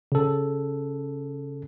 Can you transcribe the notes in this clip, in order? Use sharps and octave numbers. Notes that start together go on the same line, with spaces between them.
C#3 A4